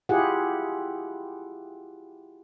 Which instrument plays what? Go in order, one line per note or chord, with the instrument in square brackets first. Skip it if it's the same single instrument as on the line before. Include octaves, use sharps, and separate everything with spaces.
[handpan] E4 F4 G4 G#4 F#5